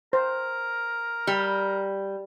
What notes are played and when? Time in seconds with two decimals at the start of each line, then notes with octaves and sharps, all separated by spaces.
0.13 A#4 C5
1.27 G3